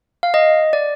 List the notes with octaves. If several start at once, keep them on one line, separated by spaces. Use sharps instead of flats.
F5
D#5
D5